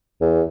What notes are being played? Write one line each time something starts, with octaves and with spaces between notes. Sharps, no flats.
E2